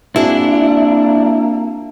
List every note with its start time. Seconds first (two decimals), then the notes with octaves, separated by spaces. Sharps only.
0.16 A#3 C4 D4 E4 F#4 G#4